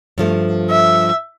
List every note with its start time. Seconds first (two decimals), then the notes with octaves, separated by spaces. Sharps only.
0.18 G2 F3 A3
0.70 E5